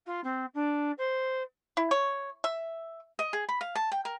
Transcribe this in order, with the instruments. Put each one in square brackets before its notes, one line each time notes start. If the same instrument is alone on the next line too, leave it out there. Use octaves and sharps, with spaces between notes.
[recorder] F4
C4
D4
C5
[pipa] E4
C#5
E5
[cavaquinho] D#5
G#4
B5
F5
A5
G5
A#4